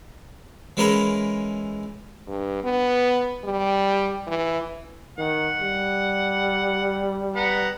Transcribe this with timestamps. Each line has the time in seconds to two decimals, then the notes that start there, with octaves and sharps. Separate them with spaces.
0.77 E3 G#3 C#4 A#4 A#5 B5
2.27 G2
2.63 B3
3.44 G3
4.27 E3
5.18 D#3 F#5
5.60 G3
7.36 B3 F#5 A#5